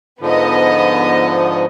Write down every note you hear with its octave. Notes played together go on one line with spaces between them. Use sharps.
G#2 D3 F3 B3 D#5